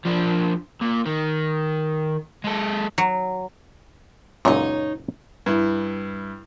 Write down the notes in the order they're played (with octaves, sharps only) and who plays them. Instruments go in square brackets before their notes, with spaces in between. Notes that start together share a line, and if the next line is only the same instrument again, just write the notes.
[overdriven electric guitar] F3 D4
A#2
D#3
G#3 A4
[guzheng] F#3
[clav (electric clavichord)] C#2 F#2 A#2 [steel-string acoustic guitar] D#4 C#5
[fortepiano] G2 E4